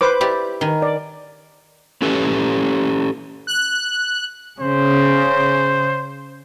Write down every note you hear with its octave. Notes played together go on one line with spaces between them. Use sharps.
B4 C5 D6
E4 G4 D5
D#3 G#5
D5
C#4 G4 A4 B4
F#6
C#3 C5